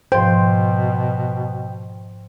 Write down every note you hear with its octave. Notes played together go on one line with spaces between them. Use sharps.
G#2 B2 F3 C5 G5